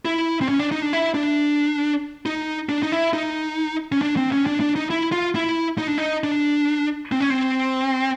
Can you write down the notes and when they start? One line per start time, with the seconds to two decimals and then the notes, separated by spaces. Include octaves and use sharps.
0.05 E4
0.41 C4
0.49 C#4
0.59 D4
0.71 D#4
0.82 D4
0.93 E4
1.14 D4
2.26 D#4
2.69 D4
2.83 D#4
2.92 E4
3.13 D#4
3.92 C#4
4.02 D4
4.17 C4
4.32 C#4
4.47 D4
4.60 D4
4.76 D#4
4.90 E4
5.12 F4
5.35 E4
5.78 D#4
5.88 D4
5.98 D#4
6.24 D4
7.12 C4
7.20 C#4
7.30 C4